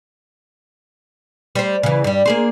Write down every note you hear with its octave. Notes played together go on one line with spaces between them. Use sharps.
G3 C5
C#3 E3
G2 G3
A#3 G#4 C5